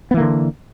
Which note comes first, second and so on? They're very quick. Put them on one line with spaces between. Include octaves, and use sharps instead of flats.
B3 E3 A#3 D3